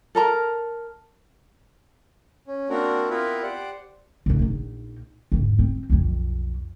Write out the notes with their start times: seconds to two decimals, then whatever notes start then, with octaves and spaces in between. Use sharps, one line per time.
0.15 A4 A#4 A#5
2.47 C#4
2.69 A#3 C4 D4 F#4 A#4
3.10 B3 C4 E4 F4 A#4 B4
3.42 G4 C5 D5 F#5
4.26 G#2 C3
4.39 A#1 D#4
5.32 E2 G#2
5.59 C4
5.90 B1 F2